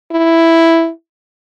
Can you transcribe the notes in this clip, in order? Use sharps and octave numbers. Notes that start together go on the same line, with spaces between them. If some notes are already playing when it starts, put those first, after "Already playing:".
E4